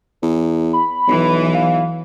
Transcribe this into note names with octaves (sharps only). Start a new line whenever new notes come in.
E2
B5
B1 E3
F5